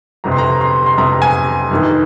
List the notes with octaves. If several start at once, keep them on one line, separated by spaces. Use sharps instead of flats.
G1 F2 C3 A#5
C6
A#5
C6
C6
G1 F2 C3 A#5
G#5
G1 F2 D#3